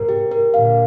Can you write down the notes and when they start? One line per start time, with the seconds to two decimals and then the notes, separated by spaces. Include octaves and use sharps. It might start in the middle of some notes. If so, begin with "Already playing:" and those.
Already playing: G#2 C3 A#4
0.09 G4
0.31 A#4
0.54 A#2 D3 F5